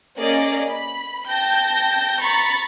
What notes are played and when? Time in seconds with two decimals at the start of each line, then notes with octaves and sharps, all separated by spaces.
0.19 A#3 C#4 G#4 D5 D#5
0.71 B5
1.29 G5 A5 G6 A#6
2.21 A#5 B5 C#6 A6